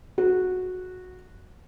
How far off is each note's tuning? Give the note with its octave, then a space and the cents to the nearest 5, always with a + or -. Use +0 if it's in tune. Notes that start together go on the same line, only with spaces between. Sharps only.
F#4 -10